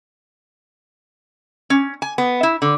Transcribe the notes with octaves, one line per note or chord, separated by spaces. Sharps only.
C#4
G#5
B3
E4
D3